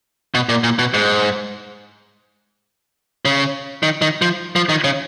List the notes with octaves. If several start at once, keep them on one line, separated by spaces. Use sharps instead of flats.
B2
A#2
A#2
B2
G#2
C#3
D#3
D#3
F3
F3
D#3
C#3